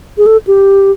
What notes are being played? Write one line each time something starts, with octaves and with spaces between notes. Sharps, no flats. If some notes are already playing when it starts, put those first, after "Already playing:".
G#4
A4
G4